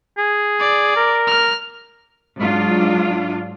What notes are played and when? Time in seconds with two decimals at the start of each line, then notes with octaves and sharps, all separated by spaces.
0.18 G#4
0.60 D5
0.96 A#4
1.27 F6
2.39 G#2 F#3 D4 F4